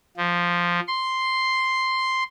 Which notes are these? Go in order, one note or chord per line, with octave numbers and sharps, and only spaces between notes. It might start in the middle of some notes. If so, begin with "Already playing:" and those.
F3
C6